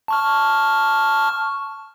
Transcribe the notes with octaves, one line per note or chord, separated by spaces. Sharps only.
A5 C#6 F6